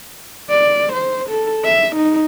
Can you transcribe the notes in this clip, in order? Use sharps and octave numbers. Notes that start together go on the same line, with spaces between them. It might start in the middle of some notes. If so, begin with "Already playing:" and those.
D5
C5
A4
E5
D#4